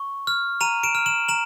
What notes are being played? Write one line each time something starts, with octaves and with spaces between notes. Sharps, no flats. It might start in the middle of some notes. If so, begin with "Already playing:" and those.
Already playing: C#6
F6
A#5 D#7 F7
D7 E7
F6
E7 F#7
A#5 E7 F#7